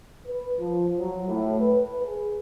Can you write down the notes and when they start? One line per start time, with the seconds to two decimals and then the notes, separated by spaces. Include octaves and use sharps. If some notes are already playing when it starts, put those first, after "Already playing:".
0.27 B4
0.59 F3
0.98 F#3
1.28 A2
1.60 B4
2.02 G#4